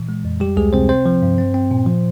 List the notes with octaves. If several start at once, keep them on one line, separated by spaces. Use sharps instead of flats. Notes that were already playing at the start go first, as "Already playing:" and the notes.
Already playing: A#2 E3
G#3
F2
G3 G4
C#2 G#3 G#4
C3 C4 C5
C4 C5
F3
G2
C4
C4
A#2
F3